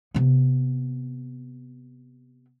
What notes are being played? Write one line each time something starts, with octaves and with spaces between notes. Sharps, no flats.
C3 B3